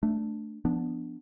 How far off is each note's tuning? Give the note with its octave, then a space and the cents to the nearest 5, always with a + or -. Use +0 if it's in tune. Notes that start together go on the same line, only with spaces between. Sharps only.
A3 +0 D4 +0
F3 -20 B3 +0 D4 +5